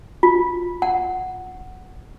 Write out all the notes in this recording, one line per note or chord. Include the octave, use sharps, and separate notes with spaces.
F4
F#5